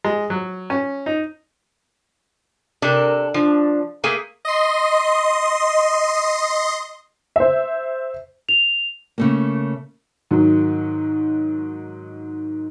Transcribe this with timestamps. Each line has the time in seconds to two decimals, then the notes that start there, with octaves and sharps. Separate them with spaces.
0.04 G#3
0.30 F#3
0.70 C#4
1.06 D#4
2.82 C3 D4 A4 A#4
3.34 F3 D4
4.04 A3 A#3 G#4 B6
4.45 D#5 C6
7.36 C5 E5
8.49 F7
9.18 C#3 A3 A#3
10.31 G#2 D#3 F#3